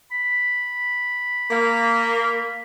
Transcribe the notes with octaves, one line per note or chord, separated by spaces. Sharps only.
B5
A#3